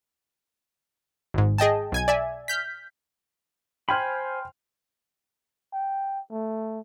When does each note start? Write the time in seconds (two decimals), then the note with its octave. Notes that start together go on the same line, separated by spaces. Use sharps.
1.34 G#1 G#2
1.58 G#4 D#5 G5 A5
1.92 B1 G#5 G#6
2.08 D5 E5 G#5
2.48 F6 G6 B6
3.89 C5 G5 G#5 B5 C6 F6
5.73 G5
6.31 A3